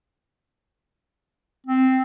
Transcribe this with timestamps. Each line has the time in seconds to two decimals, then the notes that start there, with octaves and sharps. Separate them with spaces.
1.67 C4